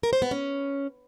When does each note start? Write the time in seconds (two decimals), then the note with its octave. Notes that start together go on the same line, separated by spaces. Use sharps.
0.03 A#4
0.13 C5
0.22 B3
0.31 C#4